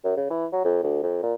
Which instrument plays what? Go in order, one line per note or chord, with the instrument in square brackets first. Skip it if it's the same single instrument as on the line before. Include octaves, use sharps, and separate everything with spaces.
[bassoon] F#2
C#3
E3
F#3
F2
D2
F2
A#2